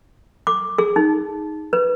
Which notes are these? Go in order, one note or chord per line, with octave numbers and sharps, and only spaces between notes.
D6
G#4
D#4
B4